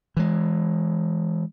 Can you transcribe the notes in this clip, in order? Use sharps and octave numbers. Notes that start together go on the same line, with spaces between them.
E3 G#3